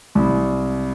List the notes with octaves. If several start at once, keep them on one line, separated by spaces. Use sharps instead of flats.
C2